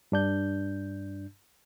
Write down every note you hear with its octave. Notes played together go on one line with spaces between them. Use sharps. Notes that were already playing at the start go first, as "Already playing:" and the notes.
G2 D4 G6